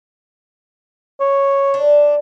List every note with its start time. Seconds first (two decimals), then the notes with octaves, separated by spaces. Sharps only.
1.20 C#5
1.74 D4